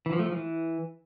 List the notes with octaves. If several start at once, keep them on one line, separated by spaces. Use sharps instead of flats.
E3
F3
A3
F3
E3